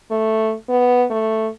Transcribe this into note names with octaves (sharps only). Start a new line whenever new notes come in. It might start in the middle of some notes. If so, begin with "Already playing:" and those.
A3
B3
A3